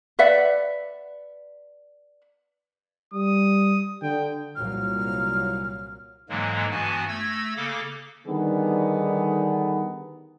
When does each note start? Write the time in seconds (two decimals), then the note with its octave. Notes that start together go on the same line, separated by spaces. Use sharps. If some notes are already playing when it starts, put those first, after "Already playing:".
0.19 B4 D5 E5 F#5
3.13 G3 D#6
4.02 D3 G5
4.56 C2 A#2 F#3 F6
6.29 G#2 D3 E3 F#3 G#3 A#3
6.71 G2 E3 B3 F#4 G#5 A5
7.09 A3 E6 G#6 A#6
7.56 C#3 A#3 A4 D6
8.27 D3 D#3 G3 B3 D#4 G#4